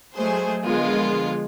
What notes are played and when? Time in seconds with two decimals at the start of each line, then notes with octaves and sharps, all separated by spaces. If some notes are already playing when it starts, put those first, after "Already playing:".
0.16 F#3 G#3 A3 G#4 C5
0.64 D3 F3 G#3 B3 F4 A#4